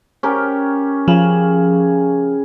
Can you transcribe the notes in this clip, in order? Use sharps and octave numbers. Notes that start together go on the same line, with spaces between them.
C#4 G4 A#4
C#3 F3